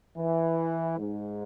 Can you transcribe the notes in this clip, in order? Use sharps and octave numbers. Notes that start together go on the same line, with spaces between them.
E3
G#2